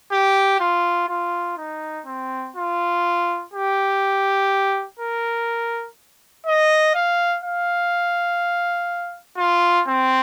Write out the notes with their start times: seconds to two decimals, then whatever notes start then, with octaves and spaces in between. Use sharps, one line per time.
0.12 G4
0.60 F4
1.09 F4
1.57 D#4
2.06 C4
2.56 F4
3.54 G4
4.99 A#4
6.46 D#5
6.95 F5
7.44 F5
9.37 F4
9.87 C4